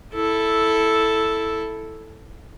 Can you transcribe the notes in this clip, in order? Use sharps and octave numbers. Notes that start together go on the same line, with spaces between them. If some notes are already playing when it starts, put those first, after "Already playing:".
E4 A4